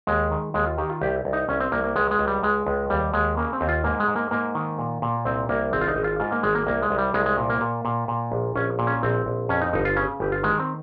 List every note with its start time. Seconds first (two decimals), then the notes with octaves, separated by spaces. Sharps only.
0.07 D#2 G#3
0.31 D#3
0.54 D#2 G#3
0.67 F4
0.78 D#3 G4
0.90 F4
1.01 C2 G4
1.25 C2
1.33 D#4
1.49 C2 C#4
1.61 C4
1.72 C2 A#3
1.84 A#3
1.96 C#2 G#3
2.11 G#3
2.19 C#2
2.27 G3
2.43 C#2 G#3
2.66 C#2
2.90 D#2 G3
3.14 D#2 G#3
3.37 C#3 A#3
3.53 C4
3.61 D#2
3.69 F4
3.84 G#2 A#3
4.00 G#3
4.08 G#2
4.16 A#3
4.31 G#2 A#3
4.55 D#3
4.79 A#2
5.02 A#2
5.25 C2 C4
5.49 C2 A#3
5.73 G#1 C4
5.81 F4
5.88 D#4
5.96 G#1
6.04 F4
6.20 G#2 F4
6.32 A#3
6.43 G#1 G#3
6.55 A#3
6.67 C2 A#3
6.82 G#3
6.90 C2
6.98 G3
7.14 C2 G#3
7.26 G#3
7.37 A#2
7.50 A#3
7.61 A#2
7.85 A#2
8.08 A#2
8.32 A#1
8.55 A#1 C#4
8.79 A#2
8.87 C#4
9.03 A#1 C4
9.26 A#1
9.49 F2 C#4
9.62 D#4
9.73 G1 D#4
9.85 F4
9.97 C#3 C#4
10.20 G1 G4
10.32 F4
10.43 D#3 G#3
10.59 C4